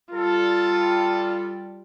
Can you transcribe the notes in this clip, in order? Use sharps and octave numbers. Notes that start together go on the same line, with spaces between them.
G3 F4 A4